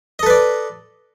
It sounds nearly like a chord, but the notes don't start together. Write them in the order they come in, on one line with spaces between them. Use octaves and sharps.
D#5 A4 B4 D5